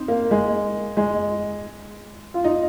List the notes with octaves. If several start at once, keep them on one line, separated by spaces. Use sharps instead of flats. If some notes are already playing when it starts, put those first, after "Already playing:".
Already playing: C4 D#4
A#3
G#3
G#3
F4
D#4